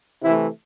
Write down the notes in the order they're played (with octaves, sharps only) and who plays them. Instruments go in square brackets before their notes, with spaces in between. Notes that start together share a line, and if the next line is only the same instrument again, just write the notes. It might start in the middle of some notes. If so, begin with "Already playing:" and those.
[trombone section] C3 E3 A3 E4